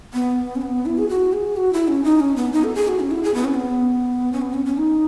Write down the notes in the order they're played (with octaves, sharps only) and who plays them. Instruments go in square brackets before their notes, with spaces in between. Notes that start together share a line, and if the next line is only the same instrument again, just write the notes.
[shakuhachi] B3
C#4
B3
E4
G#4
F#4
G#4
F#4
E4
C#4
D#4
C#4
B3
D#4
A4
G#4
F#4
C#4
E4
G#4
B3
C#4
B3
C#4
B3
C#4
C#4
D#4